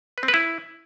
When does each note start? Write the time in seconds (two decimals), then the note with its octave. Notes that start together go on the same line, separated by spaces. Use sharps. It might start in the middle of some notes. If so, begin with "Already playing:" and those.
0.18 B4
0.23 C4
0.28 B4
0.34 E4